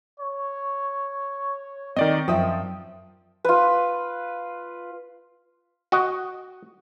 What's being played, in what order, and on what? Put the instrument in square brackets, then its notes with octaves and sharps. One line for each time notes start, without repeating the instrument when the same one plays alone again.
[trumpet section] C#5
[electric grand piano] D#3 D5 D#5 [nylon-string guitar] C4
[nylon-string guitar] F#2 E5 G5 [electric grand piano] F3 D#6
[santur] F4 B4
[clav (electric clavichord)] F#4 D#5